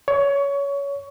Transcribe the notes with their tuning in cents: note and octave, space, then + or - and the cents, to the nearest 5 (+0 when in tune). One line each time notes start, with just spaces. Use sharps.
C#5 +20